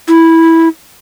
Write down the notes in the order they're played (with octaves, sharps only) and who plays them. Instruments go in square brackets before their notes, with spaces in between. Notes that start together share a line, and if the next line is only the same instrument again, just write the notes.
[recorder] E4